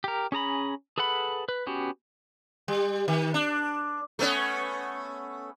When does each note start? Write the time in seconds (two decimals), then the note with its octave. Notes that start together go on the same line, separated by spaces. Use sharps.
0.04 G4 A#4
0.32 C#4 G#4 A#5 B5
0.98 G#4 A4 B4 F#5 B5
1.49 B4
1.67 B3 C#4 F#4 G4
2.68 G3
3.08 D#3
3.34 D4
4.19 A3 B3 C#4